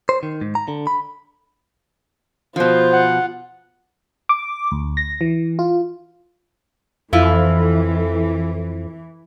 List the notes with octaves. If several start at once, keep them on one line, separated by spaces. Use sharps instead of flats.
C5
D#3
G#2
A#5
D3
B5
B2 F3 F4 C5
F#5
D6
D2
A#6
E3
F4
F2 E3 E4 F4 A4